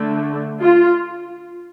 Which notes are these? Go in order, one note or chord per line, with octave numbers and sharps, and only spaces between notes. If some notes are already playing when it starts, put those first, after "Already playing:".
Already playing: D3 A3 D4
F4